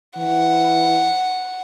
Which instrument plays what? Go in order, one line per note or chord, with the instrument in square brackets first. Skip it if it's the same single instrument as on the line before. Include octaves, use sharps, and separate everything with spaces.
[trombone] E3 [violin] F#5